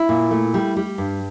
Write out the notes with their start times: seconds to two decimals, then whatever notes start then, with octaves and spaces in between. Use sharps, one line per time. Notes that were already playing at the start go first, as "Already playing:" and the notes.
Already playing: E4
0.09 A#2
0.31 A3
0.54 G3
0.77 G3
0.98 G2